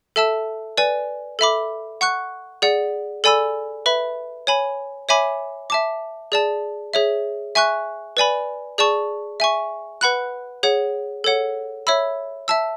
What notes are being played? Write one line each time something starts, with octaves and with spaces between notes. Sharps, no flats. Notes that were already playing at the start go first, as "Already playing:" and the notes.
A4 E5 A5 E6
B4 D5 G#5
A4 E5 B5 D6
F#5 C#6 F#6
G#4 D5 F#5
A4 D5 G#5 B5 E6
B4 E5 B5
C#5 G#5 B5
C#5 E5 G#5 B5 D6
E5 A5 D6
G#4 D5 A5
G#4 C#5 E5
E5 G#5 C#6 F#6
B4 D5 G#5 B5
G#4 D5 A5 C#6
E5 G#5 C#6
B4 F#5 B5 F#6
G#4 C#5 F#5
A4 C#5 F#5
C#5 E5 B5 E6
E5 A5 E6